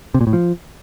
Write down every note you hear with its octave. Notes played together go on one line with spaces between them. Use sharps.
C3
A#2
A2
F3